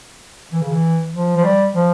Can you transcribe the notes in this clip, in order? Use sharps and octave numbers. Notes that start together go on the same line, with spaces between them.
E3
C#3
E3
F3
F3
G3
F3